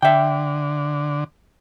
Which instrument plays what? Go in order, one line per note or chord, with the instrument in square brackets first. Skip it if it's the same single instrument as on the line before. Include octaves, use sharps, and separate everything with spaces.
[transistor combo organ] D3 [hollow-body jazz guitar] E5 G5